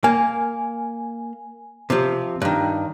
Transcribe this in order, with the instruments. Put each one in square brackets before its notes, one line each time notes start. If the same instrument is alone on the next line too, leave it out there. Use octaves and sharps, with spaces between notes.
[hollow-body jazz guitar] A#3 [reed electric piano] G#5
[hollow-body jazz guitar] C3 F3
G2 D#3